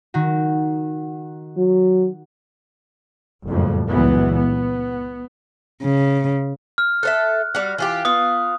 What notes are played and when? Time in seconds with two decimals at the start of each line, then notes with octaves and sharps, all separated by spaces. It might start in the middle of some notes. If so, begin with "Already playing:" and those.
0.14 D#3 F#4
1.57 F#3
3.46 F#1 F2 A2 G3
3.87 C#2 A#2 E3 F#3 B3
4.32 B3
5.83 C#3
6.78 F6
7.03 A4 C5 E5 F#6
7.55 G3 F#4
7.78 E3 F4 G4
8.05 B3 F4 D#6